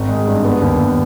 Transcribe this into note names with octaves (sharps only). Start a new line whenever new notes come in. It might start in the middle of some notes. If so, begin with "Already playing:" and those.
Already playing: G#1
G#3
G2
B3
D#2
D#2